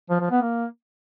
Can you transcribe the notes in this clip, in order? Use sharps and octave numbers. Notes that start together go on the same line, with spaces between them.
F3
F3
B3
A#3